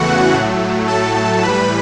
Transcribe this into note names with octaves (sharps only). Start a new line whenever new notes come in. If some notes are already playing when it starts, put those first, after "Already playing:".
Already playing: E2 C#3 E3 A3 F#4 F#5
A2 F#3 A3
A2 F#3 A3 A4 A5
A2 E3 G3 B4 B5